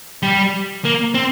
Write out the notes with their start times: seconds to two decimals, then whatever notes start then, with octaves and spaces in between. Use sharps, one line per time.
0.23 G3
0.85 A#3
1.14 C4